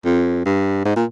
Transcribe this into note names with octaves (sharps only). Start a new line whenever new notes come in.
F2
G2
G#2
A#2